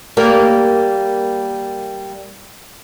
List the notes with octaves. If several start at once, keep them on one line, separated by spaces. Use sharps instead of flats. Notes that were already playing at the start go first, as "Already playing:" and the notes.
G3 A#3